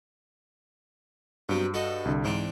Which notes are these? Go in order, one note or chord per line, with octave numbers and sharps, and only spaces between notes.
G2 F#3 B3 C4
F#4 A4 D#5
C2 D3
G#2 E3 C4 D4